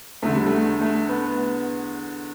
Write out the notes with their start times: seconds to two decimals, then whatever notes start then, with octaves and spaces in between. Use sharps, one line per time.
0.22 E2 D3 A3
0.35 G3
0.47 A3
0.81 A3
1.09 B3